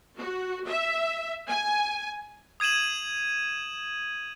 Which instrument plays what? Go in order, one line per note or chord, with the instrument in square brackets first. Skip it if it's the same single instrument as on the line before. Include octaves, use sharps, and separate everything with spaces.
[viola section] F#4
E5
G#5
[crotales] D#6 G#6 D#7 E7 F#7